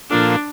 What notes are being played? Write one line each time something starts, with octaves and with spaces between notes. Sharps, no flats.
A#2 F3 A#3 D4 F4 A4